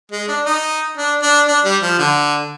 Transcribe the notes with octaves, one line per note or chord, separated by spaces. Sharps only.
G#3
D4
D#4
D4
D4
D4
G3
F3
D3